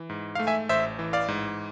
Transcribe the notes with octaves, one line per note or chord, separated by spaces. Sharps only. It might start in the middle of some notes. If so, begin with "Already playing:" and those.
Already playing: E3
G#2
A3 F5
E5 G#5
A1 C5 E5
E3
D5 F5
G#2